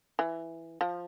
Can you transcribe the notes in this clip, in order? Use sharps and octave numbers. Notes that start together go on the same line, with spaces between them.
E3
F3